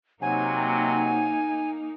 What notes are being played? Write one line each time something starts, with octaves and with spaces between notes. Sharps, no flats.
C3 F#3 A#3 D#4 G#5